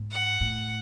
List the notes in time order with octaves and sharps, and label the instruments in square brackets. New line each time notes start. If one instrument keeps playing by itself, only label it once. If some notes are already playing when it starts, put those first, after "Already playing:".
Already playing: [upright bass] G#2
[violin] F#5
[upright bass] A2